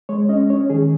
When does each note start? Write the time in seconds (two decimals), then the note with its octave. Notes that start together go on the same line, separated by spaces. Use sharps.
0.09 G#3 C#5
0.29 C#4 D#5
0.50 C#4 C#5
0.70 D#3 G#4